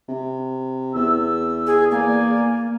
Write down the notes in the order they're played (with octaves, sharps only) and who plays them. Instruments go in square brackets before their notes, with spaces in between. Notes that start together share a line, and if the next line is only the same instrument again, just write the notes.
[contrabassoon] C3
[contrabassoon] E2 [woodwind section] E6
[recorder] G#4
[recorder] A#3 [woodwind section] D5 G#5